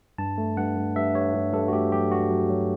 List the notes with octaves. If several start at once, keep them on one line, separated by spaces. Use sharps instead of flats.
G2 A5
A3
G2 F#5
G2
G2 E5
G2 C#5
G2
G2 A4
F#4
A3 G4
F#3 G4
G2 F#4
F#3
F#3